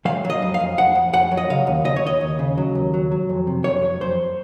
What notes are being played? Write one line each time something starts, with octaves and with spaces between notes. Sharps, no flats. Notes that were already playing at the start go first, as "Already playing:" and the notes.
F#3 F5
F#3
D#5
F2
F5
F2
F2 F#5
F2
F2 F#5
F#3
D#5
C#3 F5
D#2
C#3 D#5
C#5
D#2 D#5
D#2
C#3
F#3
D#2
F#3
F#3
F2
C3
F2 C#5
F#3
F2 C5